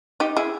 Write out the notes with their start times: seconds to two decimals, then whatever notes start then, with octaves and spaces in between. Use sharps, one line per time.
0.20 D#4 G4
0.37 E4 G#4